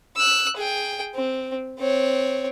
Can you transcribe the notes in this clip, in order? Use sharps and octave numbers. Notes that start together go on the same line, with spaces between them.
E6 F#6
G#4 G5
C4
C4 C#5